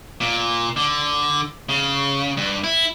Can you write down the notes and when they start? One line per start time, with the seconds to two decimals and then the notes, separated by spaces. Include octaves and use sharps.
0.21 A#2
0.77 D3
1.69 C#3
2.37 G2
2.64 E4